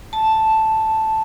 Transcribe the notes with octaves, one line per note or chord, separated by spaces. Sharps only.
A5